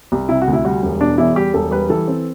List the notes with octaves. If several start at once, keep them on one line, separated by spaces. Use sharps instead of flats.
C2
C3 E4
F#4
D2
E4
G3 F#4
E1
B2 D4
E2 E4
G3 G4
E1 A4
G3 B4
E3 A4
C4